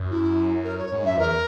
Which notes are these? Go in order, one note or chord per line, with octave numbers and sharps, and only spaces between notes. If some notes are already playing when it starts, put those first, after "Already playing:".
Already playing: F#2
E4
A#4
C#5
G#2
F#2 E5
E2 A#4